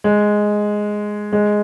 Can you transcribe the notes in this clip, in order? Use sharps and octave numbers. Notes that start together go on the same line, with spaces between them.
G#3
G#3